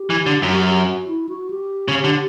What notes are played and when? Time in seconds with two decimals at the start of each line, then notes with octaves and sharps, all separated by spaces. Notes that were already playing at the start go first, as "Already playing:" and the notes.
Already playing: G4
0.10 E3
0.26 D3
0.42 F#2 F#4
0.51 G4
0.60 F#4
0.69 G4
0.78 F#4
1.07 E4
1.29 F#4
1.50 G4
1.88 C#3
2.04 D3